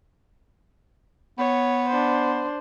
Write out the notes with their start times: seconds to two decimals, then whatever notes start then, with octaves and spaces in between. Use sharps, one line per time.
1.38 B3 C#5
1.89 D4 C5